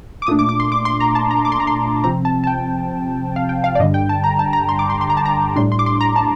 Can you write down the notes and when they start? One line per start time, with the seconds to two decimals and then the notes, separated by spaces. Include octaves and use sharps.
0.22 D6
0.27 A#2 A3 D4 D#6
0.39 D6
0.49 D6
0.60 C6
0.72 D6
0.85 C6
1.00 A#5
1.15 A5
1.31 A#5
1.45 D6
1.52 C6
1.60 A#5
1.67 C6
2.04 C3 F3 C4 A#5
2.25 A5
2.44 A5
2.47 G5
3.36 F5
3.49 G5
3.64 F5
3.75 D5
3.79 G2 D3 G3 D#5
3.94 G5
4.09 A5
4.24 A#5
4.39 A5
4.53 A#5
4.69 C6
4.79 D6
4.90 C6
5.01 C6
5.10 A#5
5.17 A5
5.26 A#5
5.56 A2 G3 D4 C6
5.72 C6
5.79 D6
5.86 C6
6.01 A#5
6.16 A5